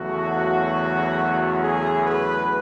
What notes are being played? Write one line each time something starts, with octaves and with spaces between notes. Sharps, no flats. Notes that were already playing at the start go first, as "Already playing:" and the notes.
Already playing: E2 C#3 F#3 A3 F#4
G#4
B4